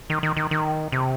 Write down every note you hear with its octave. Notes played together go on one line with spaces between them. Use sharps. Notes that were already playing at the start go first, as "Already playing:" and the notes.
D#3
D#3
D#3
D#3
C3